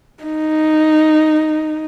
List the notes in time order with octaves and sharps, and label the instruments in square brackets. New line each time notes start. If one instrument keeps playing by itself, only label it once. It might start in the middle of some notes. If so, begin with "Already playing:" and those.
[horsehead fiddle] D#4